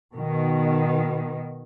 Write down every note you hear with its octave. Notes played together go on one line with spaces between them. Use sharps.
B2 D#3